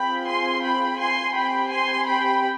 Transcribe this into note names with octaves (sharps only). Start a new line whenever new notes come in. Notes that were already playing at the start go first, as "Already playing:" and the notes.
Already playing: C4 F4 G#4 G5 B5
G#5 C6
G5 B5
G#5 C6
C4 G4 G5 B5
G#5 C6
G5 B5